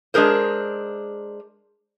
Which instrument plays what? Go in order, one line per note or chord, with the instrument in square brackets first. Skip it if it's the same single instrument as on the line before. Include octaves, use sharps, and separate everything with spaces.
[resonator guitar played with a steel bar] G#3 D4 G#4 A#4 C5